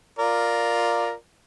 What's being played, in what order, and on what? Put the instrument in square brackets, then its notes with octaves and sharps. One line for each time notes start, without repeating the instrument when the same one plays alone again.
[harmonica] F4 A#4 D5